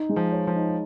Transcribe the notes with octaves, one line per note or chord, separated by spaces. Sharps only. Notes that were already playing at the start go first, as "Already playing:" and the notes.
Already playing: D#4
G#3
F3
C#5
F3
D#4